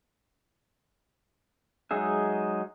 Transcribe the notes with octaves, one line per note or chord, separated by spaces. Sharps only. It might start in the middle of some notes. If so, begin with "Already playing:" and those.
F#3 G#3 D#4 G#4 E5